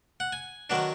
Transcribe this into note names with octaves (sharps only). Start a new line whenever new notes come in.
F#5
G#5
D#3 F#3 B3 D4